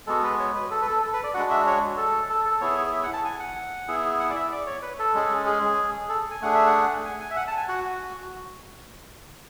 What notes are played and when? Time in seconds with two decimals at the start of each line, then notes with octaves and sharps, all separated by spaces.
0.07 G#3 B3 F#4 A4
0.24 B4
0.40 C#5
0.55 B4
0.71 A4
0.82 B4
0.87 A4
1.02 A4
1.14 B4
1.24 D5
1.34 G#3 D4 F#4 F#5
1.51 E5
1.67 C#5
1.97 A4
2.30 A4
2.45 A4
2.61 B3 E4 G#4 C#5
2.93 E5
3.03 F#5
3.13 A5
3.25 G#5
3.40 F#5
3.88 B3 E4 G#4
4.19 F#5
4.30 D5
4.35 E5
4.52 D5
4.66 C#5
4.82 B4
4.99 A4
5.14 G#3 C#4 G#4
5.46 G#4
6.09 A4
6.31 G#5
6.41 A3 D4 G#4 F#5
6.55 E5
6.67 F#5
7.05 G#5
7.20 G#5
7.31 E5
7.36 F#5
7.47 A5
7.57 G#5
7.68 F#4 F#5